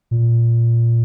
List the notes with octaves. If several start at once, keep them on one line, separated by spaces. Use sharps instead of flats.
A#2